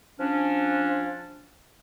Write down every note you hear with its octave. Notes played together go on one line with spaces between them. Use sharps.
F3 C#4 D4